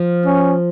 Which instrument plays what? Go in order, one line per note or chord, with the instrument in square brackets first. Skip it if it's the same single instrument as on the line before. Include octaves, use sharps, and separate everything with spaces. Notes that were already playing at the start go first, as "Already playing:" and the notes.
Already playing: [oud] F3
[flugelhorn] C#4